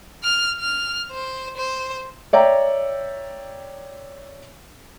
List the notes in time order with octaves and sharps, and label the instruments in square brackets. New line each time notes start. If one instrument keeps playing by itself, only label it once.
[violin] F6
F6
C5
C5
[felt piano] C#5 D5 E5 G5 A#5